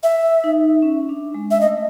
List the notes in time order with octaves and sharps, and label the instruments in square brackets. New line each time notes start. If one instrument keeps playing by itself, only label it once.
[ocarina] E5
[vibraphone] D#4
C#4
D4
G#3
[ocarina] E5
[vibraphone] A3 [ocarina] D#5